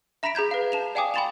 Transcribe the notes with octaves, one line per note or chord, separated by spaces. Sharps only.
E5 A#5 B5 A#6 B6 D7
G#4 A#5 G6 G#6
B4 F5
A5 E7 F7
D5 F5 G5 G#5 D6 D#6
G5 B5 C6 A6 E7 F7